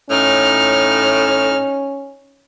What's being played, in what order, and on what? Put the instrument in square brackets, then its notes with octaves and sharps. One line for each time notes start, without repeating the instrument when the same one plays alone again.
[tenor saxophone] A2 [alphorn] C#4 [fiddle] D#4 F6